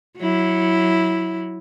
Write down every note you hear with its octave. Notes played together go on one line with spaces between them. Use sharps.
F#3 E4